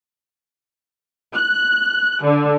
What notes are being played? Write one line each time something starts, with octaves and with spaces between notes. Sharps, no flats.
F#6
D3